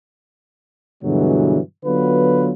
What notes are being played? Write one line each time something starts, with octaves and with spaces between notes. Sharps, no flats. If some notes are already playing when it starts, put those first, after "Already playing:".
G2 B2 D3 E3 F#3 G#3
D3 F#3 B3 F4 F#4 B4